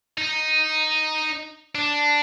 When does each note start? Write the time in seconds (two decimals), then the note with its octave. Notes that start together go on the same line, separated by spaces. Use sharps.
0.18 D#4
1.75 D4